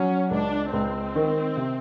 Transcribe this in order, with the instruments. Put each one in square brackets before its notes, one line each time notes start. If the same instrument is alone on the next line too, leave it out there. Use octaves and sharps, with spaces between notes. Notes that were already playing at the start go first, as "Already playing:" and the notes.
Already playing: [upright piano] F#3 [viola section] C#4
[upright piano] C#2 [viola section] D4
[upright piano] C#2 [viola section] C4
[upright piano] D#3
C3